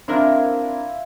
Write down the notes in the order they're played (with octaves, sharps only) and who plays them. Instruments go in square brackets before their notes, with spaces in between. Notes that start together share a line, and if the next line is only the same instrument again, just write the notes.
[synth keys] C4 D4 A#4 [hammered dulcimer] E4 F4